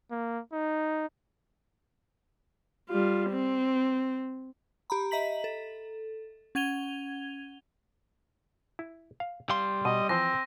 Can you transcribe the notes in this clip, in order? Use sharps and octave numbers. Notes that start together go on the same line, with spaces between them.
A#3
D#4
G3 F4
C4
G4 A#5 B5
D#5 E5 A#5 B6 F#7
A4
C#4 F#5 G#6 D#7 F7 G7
E4
F5
G3 F5 G5 C6
B2 D#5 D#7
E3 F3 C4 C5 A#6